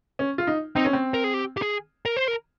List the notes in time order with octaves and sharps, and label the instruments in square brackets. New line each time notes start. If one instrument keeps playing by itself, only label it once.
[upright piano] C#4
F4
D#4
[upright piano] C4 [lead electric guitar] D#4
[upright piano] C#4
C4
[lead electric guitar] A#4
G#4
G4
G4
G#4
A#4
C5
A#4